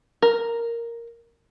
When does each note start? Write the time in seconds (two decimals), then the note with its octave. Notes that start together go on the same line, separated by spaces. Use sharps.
0.22 A#4